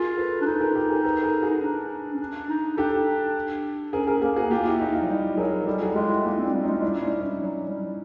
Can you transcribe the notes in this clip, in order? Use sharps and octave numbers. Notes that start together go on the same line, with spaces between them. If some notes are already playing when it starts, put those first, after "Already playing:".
Already playing: F4 G#4 A#4
A4 B4
D4
D#4 A4 B4
G#4 A#4
G4 A4
G#4 A#4
A4 B4
G#4 A#4
F#4 G#4
D#4
D4
C#4
D4
D#4
D4 G4 A4
C#4 G#4 A#4
G#4 A#4
A#3 G#4 A#4
F#4 G#4
A#3 F4 G4
E4 F#4
D#4 F4
D#4 F4
F#3
G3 D#4 F4
F#3 G#4 A#4
G3 G4 A4
F#4 G#4
G3
G#3 F4 G4
E4 F#4
A#3 D#4 F4
C4
D4 E4
G3
G#3 C#4 D#4
G3 D4 E4
C#4 D#4
D4 E4
F#3
G3